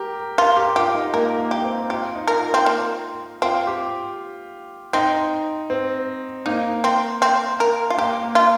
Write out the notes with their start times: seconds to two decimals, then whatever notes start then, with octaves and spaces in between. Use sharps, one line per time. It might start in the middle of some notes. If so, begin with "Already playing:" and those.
Already playing: G4 A#4
0.38 F4 A#4
0.57 G4
0.76 F4 G4
0.95 D#4
1.14 A#3 A#4
1.38 A#3
1.51 G4
1.64 C4
1.89 F4 G4
2.15 D#4
2.28 A#4
2.40 F4
2.54 C4
2.66 A#3
3.42 C4 F4
3.67 G4
4.93 C4 D#4
5.70 C4
6.46 A#3 D#4
6.84 C4
7.22 C4
7.60 A#4
7.90 F4
7.98 A#3 G4
8.24 A#3
8.35 F4